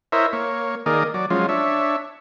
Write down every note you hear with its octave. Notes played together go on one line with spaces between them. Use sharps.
E4 A#4 C5 C#5 D#5 E5
A#3 C#5
D#3 A#3 G#4 A#4 D5 D#5
F#3 D5
F3 F#3 G#3 C#4 F4
D4 C#5 E5